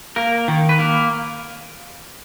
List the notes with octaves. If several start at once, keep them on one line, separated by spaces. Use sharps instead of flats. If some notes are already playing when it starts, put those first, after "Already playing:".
A#3 A#4
D#3
B4
A#3 A#4